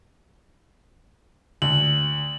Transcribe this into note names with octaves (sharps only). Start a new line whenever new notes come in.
D2 F#7